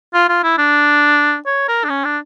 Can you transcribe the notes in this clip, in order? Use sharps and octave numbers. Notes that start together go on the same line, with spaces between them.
F4
F4
E4
D4
C#5
A#4
D4
C#4
D4